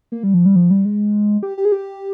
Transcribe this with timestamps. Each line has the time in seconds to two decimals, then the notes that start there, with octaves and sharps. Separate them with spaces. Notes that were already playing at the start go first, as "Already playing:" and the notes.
0.12 A#3
0.23 G3
0.34 F3
0.46 G3
0.56 F3
0.71 G3
0.85 G#3
1.43 G4
1.58 G4
1.65 G#4
1.72 G4